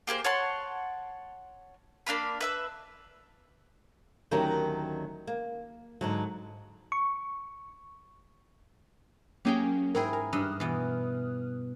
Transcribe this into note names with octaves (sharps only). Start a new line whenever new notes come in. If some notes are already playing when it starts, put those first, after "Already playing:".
A#3 G4 G#4 C5
C#5 F#5 A5 C6
A#3 D4 F5 B5
B4 E5 E6
D2 D#3 F#3 C#4 G4 A#4
A#3
G#2 D3 F#3
C#6
F#3 A#3 C#4 G4 G#4 G5
G#2 E4 G#4 A#4 G5
A#4 G#5
G2 D#5 E5 D#6 F6 F#6
B2 E3